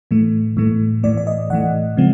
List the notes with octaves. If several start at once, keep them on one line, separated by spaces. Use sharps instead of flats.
A2 E3 A3
A2 E3 A3
A2 E3 A3 D5
D5
D#5
A2 E3 A3 F#5
C#3 F3 G#3 C4